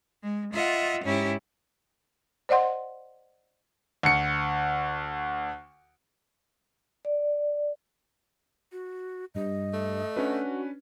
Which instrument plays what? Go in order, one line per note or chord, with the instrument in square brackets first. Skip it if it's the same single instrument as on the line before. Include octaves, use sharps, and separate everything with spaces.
[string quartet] G#3
F4 D#5 E5 F#5
G#2 C#4 E4 G4
[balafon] C5 D5 D#5 F#5 C6
[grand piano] D2 C#7
[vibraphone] D5
[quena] F#4
[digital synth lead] G2 [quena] D#5
[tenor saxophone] A3
[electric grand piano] C#4 D4 B4 [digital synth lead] F#4